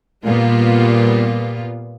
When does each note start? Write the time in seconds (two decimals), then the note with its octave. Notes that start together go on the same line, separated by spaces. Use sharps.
0.25 A#2 G3 B3 F4